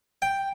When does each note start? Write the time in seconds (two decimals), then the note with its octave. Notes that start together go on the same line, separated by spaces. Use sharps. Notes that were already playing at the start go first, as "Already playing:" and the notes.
0.22 G5